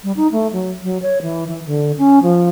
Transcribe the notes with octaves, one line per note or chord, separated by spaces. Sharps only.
G3
D#4
A3
F#3
F#3
C#5
E3
E3
D3
C#4
F3